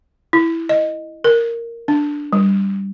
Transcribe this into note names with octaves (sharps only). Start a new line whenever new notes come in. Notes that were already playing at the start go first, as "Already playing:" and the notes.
E4
D#5
A#4
D4
G3